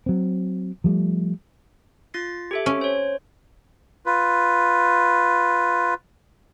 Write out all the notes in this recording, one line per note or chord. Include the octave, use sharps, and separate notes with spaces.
F#3 C4
F3 G3 A3
F4 A6 C7
G4 A4 E5
C#4
C5 C#5
F4 B4